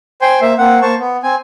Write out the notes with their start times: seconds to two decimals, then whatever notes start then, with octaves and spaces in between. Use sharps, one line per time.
0.22 C5 G5 G#5 C6
0.41 A#3 C5 E5
0.58 A#3 C4 F#5
0.82 A#3 C5 A5 C#6
0.99 B3
1.23 C4 G#5